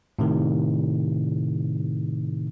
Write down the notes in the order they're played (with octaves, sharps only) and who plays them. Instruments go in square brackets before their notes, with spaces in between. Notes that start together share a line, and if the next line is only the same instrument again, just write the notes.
[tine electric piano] A2 C3 D#3